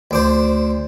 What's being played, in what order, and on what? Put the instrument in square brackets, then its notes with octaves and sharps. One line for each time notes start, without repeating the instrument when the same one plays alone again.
[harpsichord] D2 D4 C5